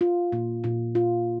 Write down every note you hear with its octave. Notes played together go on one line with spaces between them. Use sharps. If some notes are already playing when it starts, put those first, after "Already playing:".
F4
A#2
A#2
F4